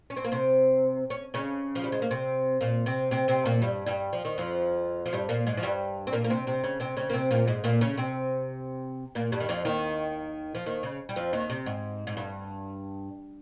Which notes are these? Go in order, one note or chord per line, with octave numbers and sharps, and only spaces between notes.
C#4
C4
A#3
C3 C4
C#4
C#3 C#4
F3
G3
G#3
A#3
C3 C4
A#2 A#3
C3 C4
C3 C4
C3 C4
A#2 A#3
G2 G3
G2 G3
F3
D#3
F2 F3
F3
G2 G3
A#2 A#3
G#2 G#3
F3
G2 G3
C4
A#2 A#3
A#3
C3 C4
C3 C4
C#3 C#4
C3 C4
C#3 C#4
A#3
C3 C4
A#2 A#3
G#2 G#3
A#2 A#3
C#3 C#4
C3 C4
A#2 A#3
G2 G3
D#3
F2 F3
D#2 D#3
F3
D#2 D#3
C#3
G3
F2 F3
D#2 D#3
C3
G#2
G#2
G2